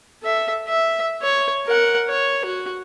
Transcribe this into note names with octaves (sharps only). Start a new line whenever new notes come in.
A4 E5
E5
C#5
A#4 F#5
C#5
F#4